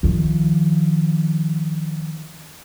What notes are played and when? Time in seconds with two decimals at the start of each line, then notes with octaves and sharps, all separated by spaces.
0.03 D#3 F3